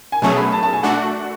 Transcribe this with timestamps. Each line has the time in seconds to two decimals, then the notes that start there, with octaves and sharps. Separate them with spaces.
0.12 G#5
0.22 B2 F#3 A3 C#4 G#4 A5
0.37 B5
0.52 A5
0.63 A5
0.73 G#5
0.83 A3 D4 F#4 F#5